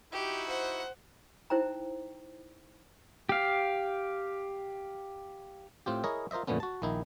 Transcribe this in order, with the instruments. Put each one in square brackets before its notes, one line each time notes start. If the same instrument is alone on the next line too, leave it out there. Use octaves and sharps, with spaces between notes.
[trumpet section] D#4 E4 F#4 [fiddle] G4
[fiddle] C5 F#5
[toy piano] D#4 E4 C5 G5 A#5
[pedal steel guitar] G4 F5
[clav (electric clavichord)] A2 C4 F4 G4
E4 G#4 A#4 C#5 D#5
F4 A#4 C5 D#5 E5
F2 A#2 D3 A3 B3 C#4
F#4 A5
A#1 D#3 D#4 E4